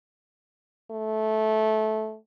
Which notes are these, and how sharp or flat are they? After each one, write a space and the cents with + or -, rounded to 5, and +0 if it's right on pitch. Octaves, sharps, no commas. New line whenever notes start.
A3 -15